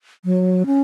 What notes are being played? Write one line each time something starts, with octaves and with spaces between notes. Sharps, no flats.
F#3
C#4